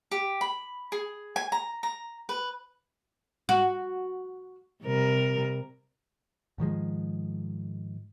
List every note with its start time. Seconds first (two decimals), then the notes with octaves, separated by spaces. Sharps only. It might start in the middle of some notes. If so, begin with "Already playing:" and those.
0.11 G4
0.41 B5
0.92 G#4
1.36 G#5
1.52 A#5
1.83 A#5
2.29 B4
3.49 F#4
4.83 C3 G3 A#4
6.58 G#2 D#3 F3 G#3